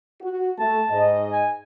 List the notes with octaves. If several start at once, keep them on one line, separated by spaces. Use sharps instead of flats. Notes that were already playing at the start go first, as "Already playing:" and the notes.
F#4
A3 A5
G#2 D#5
G#5